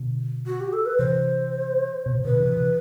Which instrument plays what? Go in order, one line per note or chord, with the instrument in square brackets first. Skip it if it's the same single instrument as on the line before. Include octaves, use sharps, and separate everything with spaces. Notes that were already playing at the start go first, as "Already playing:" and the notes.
Already playing: [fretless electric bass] B2 D3
[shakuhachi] F#4
G4
A4
B4
[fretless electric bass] C3 E3 [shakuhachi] C5
[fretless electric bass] B2
C3
[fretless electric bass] B2 D3 [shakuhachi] B4
[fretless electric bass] C3 E3
C3 E3